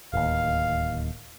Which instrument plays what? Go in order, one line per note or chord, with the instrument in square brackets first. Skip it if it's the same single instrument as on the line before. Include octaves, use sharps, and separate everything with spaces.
[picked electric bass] D1 D#2 [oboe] F5